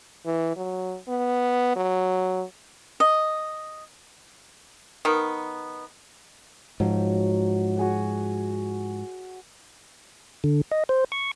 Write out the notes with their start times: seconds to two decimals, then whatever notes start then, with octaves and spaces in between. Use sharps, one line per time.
0.26 E3
0.57 F#3
1.09 B3
1.76 F#3
3.00 D#5
5.05 D#3 B3
6.80 G#2 F3 F#3
7.77 F#4 G#4 F#5
10.44 D3
10.72 D#5
10.89 C5
11.12 C#6